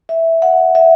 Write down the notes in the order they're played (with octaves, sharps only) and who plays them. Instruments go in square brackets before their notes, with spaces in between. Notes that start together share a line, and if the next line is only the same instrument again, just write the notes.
[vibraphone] E5
F#5
E5